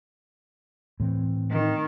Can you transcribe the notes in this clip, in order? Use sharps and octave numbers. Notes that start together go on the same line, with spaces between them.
A2 E3 C4
D#3